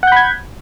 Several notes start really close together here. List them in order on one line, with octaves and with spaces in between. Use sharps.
F#5 G6 B5 G#6